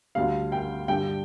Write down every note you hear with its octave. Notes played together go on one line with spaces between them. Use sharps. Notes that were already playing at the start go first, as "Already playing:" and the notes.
D2 D3 G3 F5
G5
G2 D3 G3 G5